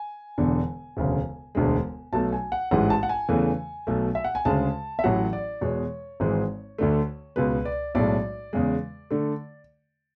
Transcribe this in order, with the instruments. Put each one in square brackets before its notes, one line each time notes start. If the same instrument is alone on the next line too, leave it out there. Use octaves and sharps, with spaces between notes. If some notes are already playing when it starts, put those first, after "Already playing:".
Already playing: [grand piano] G#5
E1 E2 D3
E1 D2 C#3
E1 D2 D3 G#3
B1 B2 A3 A5
G#5
F#5
A1 G#2 E3 G#3 F#5
A5
F#5
G#5
E2 C#3 E3 A3
B1 B2 A3
E5
F#5
G#5
D2 C#3 G#3 A5
E5
A1 A2 F#3 F#5
D5
E2 B2 G#3 C#5
G#1 G#2 E3 G#3
D2 D3 A3
C#2 B2 G#3 B4
D5
B1 A2 G#3 D5
E2 C#3 G#3
D3 A3